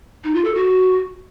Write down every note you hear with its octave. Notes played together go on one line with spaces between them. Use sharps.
D#4
F4
A4
F#4